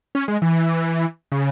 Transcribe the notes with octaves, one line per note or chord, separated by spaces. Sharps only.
C#4
G#3
E3
C#3